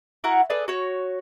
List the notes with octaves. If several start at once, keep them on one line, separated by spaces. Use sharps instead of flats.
E4 F#4 A#4 F#5
G#4 A4 B4 D5
F#4 C#5